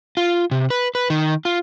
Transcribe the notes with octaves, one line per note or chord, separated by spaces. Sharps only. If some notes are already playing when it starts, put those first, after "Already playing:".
F4
C3
B4
B4
D#3
F4